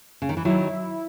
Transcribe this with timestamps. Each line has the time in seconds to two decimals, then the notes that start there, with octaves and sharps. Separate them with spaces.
0.22 C#3
0.29 D#3
0.37 E3
0.45 D#3 F#3 E4